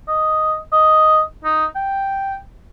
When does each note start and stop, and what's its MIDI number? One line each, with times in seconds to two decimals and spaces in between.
0.08 0.56 75
0.72 1.21 75
1.44 1.65 63
1.75 2.36 79